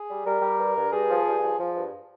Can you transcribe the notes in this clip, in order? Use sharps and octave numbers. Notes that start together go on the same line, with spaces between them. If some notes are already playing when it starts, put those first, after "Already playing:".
Already playing: G#4
G3
G3 A#4
G3
G2
G2
G2 G#4
F3
G2
F3
F3
G2